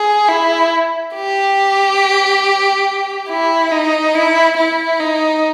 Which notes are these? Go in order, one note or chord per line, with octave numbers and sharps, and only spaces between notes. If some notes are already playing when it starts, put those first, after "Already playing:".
Already playing: G#4
E4
G4
E4
D#4
E4
E4
D#4